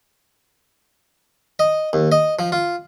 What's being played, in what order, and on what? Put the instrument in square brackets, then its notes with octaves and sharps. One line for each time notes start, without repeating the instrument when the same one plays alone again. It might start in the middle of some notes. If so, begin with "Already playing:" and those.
[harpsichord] D#5
D#2
D#5
F3
F4